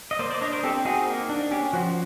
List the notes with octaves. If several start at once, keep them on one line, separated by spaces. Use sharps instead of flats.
D#5
A#3 C5 D5
C5 D5
D4 C#5 D#5
A#4 C5
C4 G4 A4
D#4 F#4 G#4
A#3
D4
C#4 G4
F3 F#4